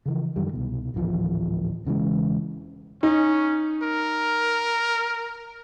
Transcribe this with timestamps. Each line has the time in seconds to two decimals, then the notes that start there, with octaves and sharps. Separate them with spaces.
0.06 C#3 E3 F3
0.36 F#2 D#3 G3
0.53 C2 B2
0.94 D1 G#1 E3 F3
1.85 E1 C#3 E3 G#3
3.03 C#4 D#4
3.83 A#4